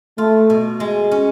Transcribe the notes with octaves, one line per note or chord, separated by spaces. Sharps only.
A3 F4
B2
G#3
C#4